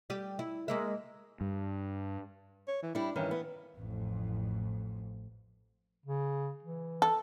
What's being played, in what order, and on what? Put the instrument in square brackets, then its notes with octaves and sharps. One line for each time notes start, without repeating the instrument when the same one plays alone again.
[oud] G3 G4
E4
G#3 A#3 E5
[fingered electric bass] G2
[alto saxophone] C#5
E3
[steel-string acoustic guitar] G3 E4 [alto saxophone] D4
[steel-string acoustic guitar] G2 D#3 C#4 [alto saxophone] E3
[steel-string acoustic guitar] B3
[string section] A1 F2
[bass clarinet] C#3
E3
[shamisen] A4